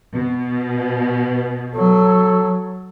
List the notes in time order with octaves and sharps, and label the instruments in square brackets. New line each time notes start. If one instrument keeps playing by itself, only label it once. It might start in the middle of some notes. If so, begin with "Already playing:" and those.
[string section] B2
[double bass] F#3 [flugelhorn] A4